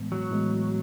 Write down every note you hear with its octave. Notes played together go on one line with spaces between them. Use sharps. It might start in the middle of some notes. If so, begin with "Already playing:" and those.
Already playing: A2 E3 G#3 B3
F#3
A2 E3 G#3 B3